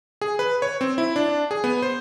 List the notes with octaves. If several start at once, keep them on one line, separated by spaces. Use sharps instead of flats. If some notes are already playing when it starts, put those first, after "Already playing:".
G#4
B4
C#5
C4
E4
D4
G#4
B3
C5